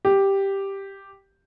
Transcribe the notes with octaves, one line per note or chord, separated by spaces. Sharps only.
G4